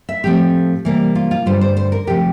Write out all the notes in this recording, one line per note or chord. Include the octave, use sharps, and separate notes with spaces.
E5
A2 F3 A3 C4 G4
C3 E3 G3 A#3
F4
F4
G2 D3 G3 C5
C5
C5
A#4
D2 C3 F3 A3 G4